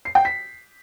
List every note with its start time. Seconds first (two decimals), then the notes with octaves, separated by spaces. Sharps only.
0.05 C7
0.15 G5
0.25 B6